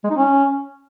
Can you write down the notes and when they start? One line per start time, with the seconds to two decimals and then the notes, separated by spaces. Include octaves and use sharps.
0.04 G#3
0.10 D#4
0.16 C#4